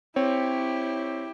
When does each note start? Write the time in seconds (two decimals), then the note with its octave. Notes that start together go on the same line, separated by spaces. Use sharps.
0.16 C4 E4 G4 C#5